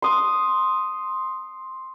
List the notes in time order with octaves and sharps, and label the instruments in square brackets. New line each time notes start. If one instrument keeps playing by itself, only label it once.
[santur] C6 D#6